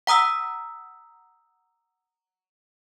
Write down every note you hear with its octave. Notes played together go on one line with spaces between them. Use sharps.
F#5 A#5 D#6 E6 B6